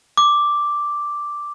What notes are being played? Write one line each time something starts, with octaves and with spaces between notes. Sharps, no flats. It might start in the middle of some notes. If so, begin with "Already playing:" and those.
D6